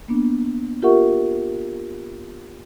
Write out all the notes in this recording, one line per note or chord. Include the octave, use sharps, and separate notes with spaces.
A#3 B3 D4
F4 G4 A#4 E5 F#5 C#6